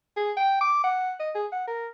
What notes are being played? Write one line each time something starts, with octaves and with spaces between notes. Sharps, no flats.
G#4
G5
D6
F#5
D#5
G#4
F#5
A#4